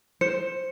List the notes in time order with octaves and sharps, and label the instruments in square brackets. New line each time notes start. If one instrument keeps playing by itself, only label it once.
[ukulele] C5 [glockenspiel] C#7